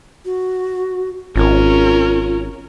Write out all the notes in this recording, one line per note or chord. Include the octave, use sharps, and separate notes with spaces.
F#4
G#1 C#4 F4 A#4